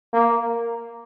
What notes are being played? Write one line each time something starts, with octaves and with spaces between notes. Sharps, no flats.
A#3